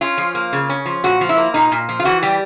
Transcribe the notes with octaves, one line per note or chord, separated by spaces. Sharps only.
C#4 F4
F3
A#3
C#3
C#4
F3
A#2 F#4
F3
E4
A#3
A#2 D#4
A#2
F3
F4
E3 F#4
G3 G4